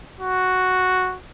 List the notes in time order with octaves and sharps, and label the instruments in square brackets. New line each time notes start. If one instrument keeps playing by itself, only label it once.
[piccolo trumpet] F#4